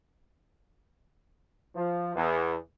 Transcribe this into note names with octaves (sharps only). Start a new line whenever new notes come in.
F3
E2